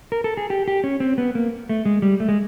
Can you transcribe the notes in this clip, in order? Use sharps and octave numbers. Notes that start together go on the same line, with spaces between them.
A#4
A4
G#4
G4
G4
C#4
C4
B3
A#3
A3
G#3
G3
A3
G#3